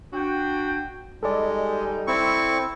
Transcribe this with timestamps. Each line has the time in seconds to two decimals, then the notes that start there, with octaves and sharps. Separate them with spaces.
0.13 D4 F#4 G5
1.23 G3 G#3 D#4 A4 D5
2.07 C4 E4 C#6